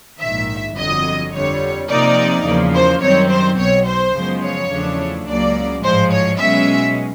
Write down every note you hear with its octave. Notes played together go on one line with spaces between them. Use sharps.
A#1 G#2 D#3 E5
G1 F2 D3 F#3 D#5
F2 D3 G3 C#5
F2 C3 F3 A#3 D#4 D5
E2 C#3 F3 A#3
C5
F#2 D#3 G3 C4 C#5
C5
B1 B2 F#3 C#5
C5
F#2 C#3 F3 G#3 B3
C#5
E2 C#3 F3 A3 D4
C#2 C#3 F#3 A#3 D5
A1 G#2 F3 G#3 C5
C#5
B1 B2 G#3 C#4 E5